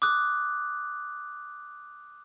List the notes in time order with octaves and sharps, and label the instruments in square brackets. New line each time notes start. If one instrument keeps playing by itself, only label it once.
[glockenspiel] D6 D#6 F#6